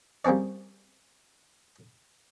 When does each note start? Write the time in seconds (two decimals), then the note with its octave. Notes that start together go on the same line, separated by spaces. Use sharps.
0.25 G3 A#3 C4 C#4 D5